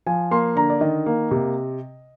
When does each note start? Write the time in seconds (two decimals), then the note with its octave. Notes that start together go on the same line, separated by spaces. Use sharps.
0.06 F3 G#5
0.31 A#3 C6
0.56 D3 A#5
0.70 D5
0.81 D#3 D#5
1.06 A#3
1.31 C3